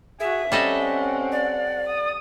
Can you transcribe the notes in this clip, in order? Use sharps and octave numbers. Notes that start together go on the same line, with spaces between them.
F#4 G#4 E5
G3 C4 C#4 A4 D#5 F#5
D5
D#6